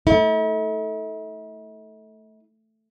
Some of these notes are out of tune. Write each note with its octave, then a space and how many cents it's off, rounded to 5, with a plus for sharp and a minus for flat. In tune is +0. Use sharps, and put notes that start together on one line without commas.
A3 +0 E4 -45